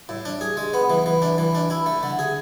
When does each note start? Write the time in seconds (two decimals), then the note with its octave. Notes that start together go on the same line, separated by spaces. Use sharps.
0.09 A2
0.25 D4
0.41 G#4
0.57 G#3
0.74 B3
0.90 E3
1.06 E3
1.22 D4
1.38 E3
1.55 D4
1.70 E4
1.86 A3
2.03 D3
2.19 G#4